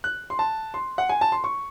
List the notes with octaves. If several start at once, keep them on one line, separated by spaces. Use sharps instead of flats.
F#6
C6
A5
C6
F#5
G#5
A5
C6
C#6